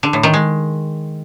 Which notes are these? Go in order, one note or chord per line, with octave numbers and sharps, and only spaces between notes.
D3
A2
D#3
G#3